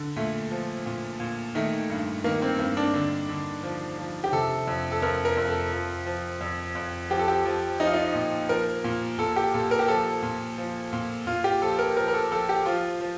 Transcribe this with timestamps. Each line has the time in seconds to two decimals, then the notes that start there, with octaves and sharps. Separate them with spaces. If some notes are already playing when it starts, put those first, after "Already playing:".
Already playing: D3
0.16 A#2 A3
0.51 F3
0.86 A#2
1.20 A#2
1.55 D#3 A3
1.90 G2
2.24 D#3 A#3
2.42 C4
2.59 G2 A#3
2.77 D4
2.94 D3
3.29 D3
3.63 F3
3.98 F3
4.24 G4
4.33 C3 A4
4.67 F2
4.92 A4
5.02 F2 A#4
5.25 A#4
5.37 F2
5.48 A4
5.72 F3
6.06 F3
6.41 F2
6.75 F2
7.10 F3 G4
7.19 A4
7.28 G4
7.45 F3
7.80 F3 D#4
7.87 F4
7.94 D#4
8.15 A#2
8.49 F3 A#4
8.84 A#2
9.18 A#2 A4
9.36 G4
9.54 A#2 A4
9.71 A#4
9.79 G4
9.88 F3 A4
10.23 A#2
10.58 F3
10.93 A#2
11.27 A#2 F4
11.44 G4
11.62 F3 A4
11.79 A#4
11.96 F3 A#4
12.08 A#4
12.14 A4
12.31 F3 A4
12.49 G4
12.66 F3 F4
13.01 F3